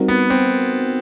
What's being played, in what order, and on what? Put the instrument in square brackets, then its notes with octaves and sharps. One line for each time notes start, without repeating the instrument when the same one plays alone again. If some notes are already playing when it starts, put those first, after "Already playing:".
Already playing: [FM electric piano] G3 C4 D#4 F#4 A#4
[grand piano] B3
C4